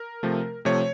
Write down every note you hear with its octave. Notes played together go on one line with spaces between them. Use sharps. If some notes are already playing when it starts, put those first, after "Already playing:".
Already playing: A#4
C3 F3 A3
C3 F3 A3 C#5